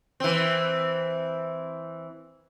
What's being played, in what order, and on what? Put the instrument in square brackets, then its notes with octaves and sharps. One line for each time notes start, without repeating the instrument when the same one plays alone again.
[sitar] E3 C4